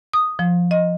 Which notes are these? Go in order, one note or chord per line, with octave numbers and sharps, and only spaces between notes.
D#6
F3
D#5